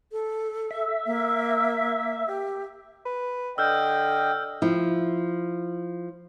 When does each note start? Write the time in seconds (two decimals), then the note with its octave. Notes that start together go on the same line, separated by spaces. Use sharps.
0.12 A4
0.71 E5
1.06 A#3
2.27 G4
3.06 B4
3.58 D3 D#5 G5 E6 F6 G6
4.62 F3 E4